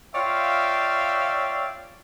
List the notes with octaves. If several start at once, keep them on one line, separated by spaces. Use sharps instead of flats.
F4 C#5 D5 E5 F5 G5